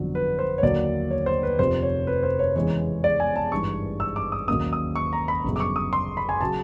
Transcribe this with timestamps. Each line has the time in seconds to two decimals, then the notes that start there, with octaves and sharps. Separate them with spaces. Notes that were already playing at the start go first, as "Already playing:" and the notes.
Already playing: G1 F2 D3 F#3
0.15 B4
0.39 C5
0.58 C#5
0.63 D#2 D3 F#3 A#3 D4 D5
1.11 C#5
1.26 C5
1.43 B4
1.59 F1 F2 C3 F3 C5
1.82 C#5
2.07 B4
2.23 C5
2.39 C#5
2.55 E2 C#3 E3 G#3 C#5
3.04 D5
3.20 G#5
3.36 A5
3.51 G#1 G2 E3 C#6
4.00 E6
4.16 D6
4.32 D#6
4.48 D#2 D#3 F#3 A#3 C#4 D#6
4.73 D#6
4.96 C#6
5.13 A#5
5.28 B5
5.44 G1 F#2 C#3
5.56 D6
5.60 C#6
5.76 D#6
5.93 C6
6.17 B5
6.29 G#5
6.41 C#3 F#3 A5